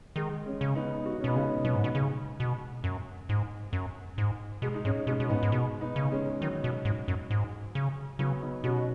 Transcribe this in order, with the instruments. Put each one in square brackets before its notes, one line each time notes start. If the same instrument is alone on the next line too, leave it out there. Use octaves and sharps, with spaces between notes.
[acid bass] D#3 [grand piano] G#3
[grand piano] G#3 C#4
[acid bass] C#3
[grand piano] B3 D#4
F#4
D#4
C#4
[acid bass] B2 [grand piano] B3 D#4
[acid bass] C#3 [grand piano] G#3 C#4
[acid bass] B2 [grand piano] F#3 B3
[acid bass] G#2
B2
[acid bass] C#3 [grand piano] G#3
[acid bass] B2
F#2
G#2
F#2
G#2
[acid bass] B2 [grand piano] G#3
[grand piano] D#4
[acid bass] G#2 [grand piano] G#3 C#4
[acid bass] B2 [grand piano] G#3 C#4
[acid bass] B2
[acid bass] G#2 [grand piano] B3 D#4
[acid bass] G#2
[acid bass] B2 [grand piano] G#3
[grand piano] B3 D#4
[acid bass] C#3
[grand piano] G#3 C#4
[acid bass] D#3 [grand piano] F#3
[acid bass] B2
G#2
F#2
G#2
C#3
[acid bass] C#3 [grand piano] F#3 B3
[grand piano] B3 D#4
[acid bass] B2 [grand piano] C#4 F#4